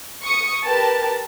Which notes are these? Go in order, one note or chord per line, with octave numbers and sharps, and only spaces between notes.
C#6 D#6 C#7
G4 A#4 B4 A5